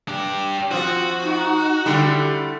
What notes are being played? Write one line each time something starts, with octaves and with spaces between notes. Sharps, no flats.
D4 G4
F3 C4 F#4
D#4
D3 G3 A3 E4 G4